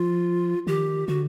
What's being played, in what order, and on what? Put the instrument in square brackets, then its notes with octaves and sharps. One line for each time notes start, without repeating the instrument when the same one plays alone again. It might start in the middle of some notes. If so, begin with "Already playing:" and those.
Already playing: [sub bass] F3 [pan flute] F4
[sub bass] D#3 [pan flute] G4
[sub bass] D3 [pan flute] F#4